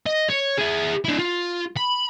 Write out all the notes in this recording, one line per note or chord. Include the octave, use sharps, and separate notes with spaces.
D#5
C#5
E4 G#4
D4 E4
F4
B5